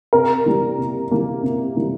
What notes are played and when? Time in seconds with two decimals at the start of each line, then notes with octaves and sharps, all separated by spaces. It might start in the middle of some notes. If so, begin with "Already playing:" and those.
0.13 C3 A#4
0.46 E3 G3 A#3
0.78 C3
1.11 E3 G3 A#3
1.43 C3
1.76 E3 G3 A#3